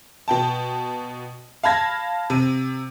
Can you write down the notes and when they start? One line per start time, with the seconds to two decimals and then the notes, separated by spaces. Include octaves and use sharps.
0.28 B2 G5 A5
1.63 F5 A5 B5 G#6 A#6
2.30 C3 D#7